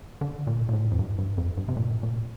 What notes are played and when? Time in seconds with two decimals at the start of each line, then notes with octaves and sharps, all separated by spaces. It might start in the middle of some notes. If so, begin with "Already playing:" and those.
0.21 D3
0.47 A#2
0.69 A#2
0.73 A2
0.91 F2
0.99 G2
1.18 G2
1.38 F2
1.57 G2
1.68 C3
1.77 A#2
2.03 A#2